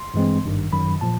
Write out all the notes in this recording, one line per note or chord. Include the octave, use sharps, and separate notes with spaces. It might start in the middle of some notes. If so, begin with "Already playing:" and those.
Already playing: C6
G2 E3 G#3 C4
G#1 G2 D#3
G1 F#2 D#3 F#3 B5
A#2 F3 A5